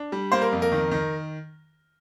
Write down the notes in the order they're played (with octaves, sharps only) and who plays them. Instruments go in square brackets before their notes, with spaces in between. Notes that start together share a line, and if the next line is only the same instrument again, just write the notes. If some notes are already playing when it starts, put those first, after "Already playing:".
Already playing: [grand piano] D4
G3
A#3 C5
A#4
F2
A#4
D#3
D#3